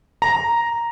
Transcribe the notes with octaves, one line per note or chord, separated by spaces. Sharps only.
A#5